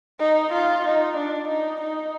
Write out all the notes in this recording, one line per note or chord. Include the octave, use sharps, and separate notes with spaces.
D#4
F4
D#4
D4
D#4
D#4